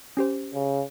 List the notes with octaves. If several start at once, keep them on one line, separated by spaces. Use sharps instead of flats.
C#4 G4 C5
C#3